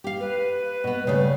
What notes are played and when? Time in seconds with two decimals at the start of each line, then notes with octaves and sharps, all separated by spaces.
0.04 G4 F5
0.21 B4
0.84 B2 B3
1.07 C#3 G3 A3